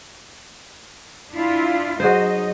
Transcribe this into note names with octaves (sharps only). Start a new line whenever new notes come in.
D4 E4 F4
F#3 D#4 F#4 G#4 C5 D#5